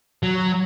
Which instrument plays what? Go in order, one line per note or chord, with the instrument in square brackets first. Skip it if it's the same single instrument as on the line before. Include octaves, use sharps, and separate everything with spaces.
[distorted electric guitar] F#3